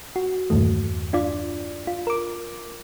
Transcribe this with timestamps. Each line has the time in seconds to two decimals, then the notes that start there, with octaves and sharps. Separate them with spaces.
0.16 F#4
0.50 E2 G2 A#2 D#3 A3
1.13 D4 F4 D5
1.87 F4
2.07 A#4 D6